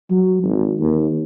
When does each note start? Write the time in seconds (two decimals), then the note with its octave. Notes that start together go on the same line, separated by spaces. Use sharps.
0.10 F#3
0.44 G#1
0.80 D#2